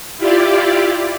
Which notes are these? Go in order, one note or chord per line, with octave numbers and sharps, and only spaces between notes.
E4 F4 G4 D5